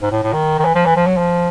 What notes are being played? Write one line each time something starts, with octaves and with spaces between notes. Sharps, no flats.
G#2
A2
A2
D#3
D#3
E3
F3
E3
F3
F#3
F3